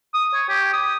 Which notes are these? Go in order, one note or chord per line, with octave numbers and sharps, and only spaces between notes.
D#6
C#5
G4
D#6